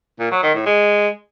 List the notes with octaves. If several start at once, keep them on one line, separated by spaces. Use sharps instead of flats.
A#2
F#3
D#3
A2
G#3